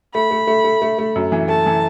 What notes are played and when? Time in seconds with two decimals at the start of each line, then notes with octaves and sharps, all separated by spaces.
0.14 A3 B5
0.31 A3
0.47 A3
0.64 A3
0.82 A3
0.99 A3
1.16 F#2
1.32 E3
1.49 A3 A5
1.66 E3